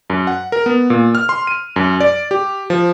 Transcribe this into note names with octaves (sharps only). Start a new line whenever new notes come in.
F#2
F#5
A#4
B3
A#2
F6
C6
D#7
F#2
D5
G4
F3